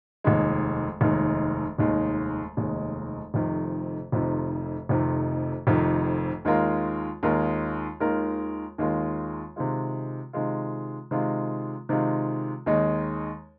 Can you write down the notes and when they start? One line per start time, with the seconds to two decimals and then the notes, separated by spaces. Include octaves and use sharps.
0.24 F1 D#2 D#3 G#3
1.01 F1 D#2 D#3 G#3
1.79 F1 D#2 D#3 G#3
2.57 F1 D#2 D#3 G#3
3.34 F1 F2 C3 D#3
4.12 F1 F2 C3 D#3
4.89 F1 F2 C3 D#3
5.67 F1 F2 C3 D#3
6.45 D#2 D#3 G#3 F4 A#4
7.23 D#2 D#3 G#3 F4 A#4
8.00 D#2 D#3 G#3 F4 A#4
8.78 D#2 D#3 G#3 F4 A#4
9.56 C3 D#3 G#3 F4
10.33 C3 D#3 G#3 F4
11.11 C3 D#3 G#3 F4
11.89 C3 D#3 G#3 F4
12.66 D#2 D#3 G#3 D#4